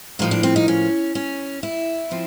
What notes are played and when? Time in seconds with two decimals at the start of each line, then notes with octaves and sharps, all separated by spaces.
0.19 A2 F3 A#3 D#4
0.31 D4
0.43 C4
0.56 D#4
0.68 C#4
1.15 C#4
1.63 E4
2.11 F3 C4